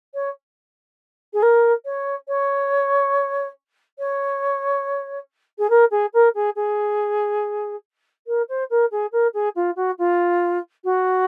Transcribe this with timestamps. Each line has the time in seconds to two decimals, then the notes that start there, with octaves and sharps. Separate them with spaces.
0.14 C#5
1.33 G#4
1.42 A#4
1.85 C#5
2.28 C#5
3.99 C#5
5.59 G#4
5.70 A#4
5.91 G#4
6.14 A#4
6.35 G#4
6.56 G#4
8.27 A#4
8.49 C5
8.70 A#4
8.91 G#4
9.12 A#4
9.34 G#4
9.56 F4
9.76 F#4
9.99 F4
10.84 F#4